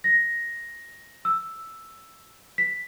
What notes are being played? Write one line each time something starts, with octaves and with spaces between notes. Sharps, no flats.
A#6
E6
B6